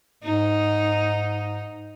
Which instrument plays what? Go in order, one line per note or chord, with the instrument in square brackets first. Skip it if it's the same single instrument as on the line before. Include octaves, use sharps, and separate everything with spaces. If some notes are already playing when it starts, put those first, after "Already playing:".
[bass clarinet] G#2 [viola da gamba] D#4